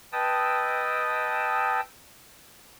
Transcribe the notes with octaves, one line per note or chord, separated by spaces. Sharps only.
B4 D#5 G5 A5 D#6 E6